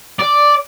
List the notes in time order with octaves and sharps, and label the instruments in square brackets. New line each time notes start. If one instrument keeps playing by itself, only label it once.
[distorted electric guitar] D5